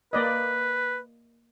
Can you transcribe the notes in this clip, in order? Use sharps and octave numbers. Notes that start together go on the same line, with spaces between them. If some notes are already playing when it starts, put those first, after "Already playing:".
A#3 B4 D5 D#5